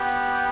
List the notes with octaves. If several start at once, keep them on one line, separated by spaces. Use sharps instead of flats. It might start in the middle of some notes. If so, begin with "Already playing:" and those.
Already playing: B3 G4